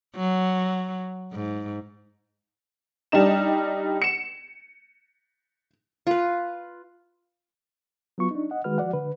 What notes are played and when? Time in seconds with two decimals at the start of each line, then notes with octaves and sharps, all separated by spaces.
0.16 F#3
1.32 G#2
3.12 G3 D4 D#4 E7
4.02 C#7 E7
6.07 F4 B4
8.18 F#3 B3 F4 C#6
8.31 D4 D#4
8.51 D#5 F#5
8.64 D#3 G#3 F#4 B4 F6
8.78 F3 F#4 D5 F#5
8.93 D3 B4